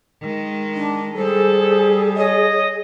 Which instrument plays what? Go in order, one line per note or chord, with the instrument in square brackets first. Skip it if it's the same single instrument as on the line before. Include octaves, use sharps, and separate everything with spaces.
[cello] D#3 G#3
[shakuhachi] D4
[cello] G3 [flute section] G#4 [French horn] A4 [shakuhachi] C5
[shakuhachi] C#5 [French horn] D#5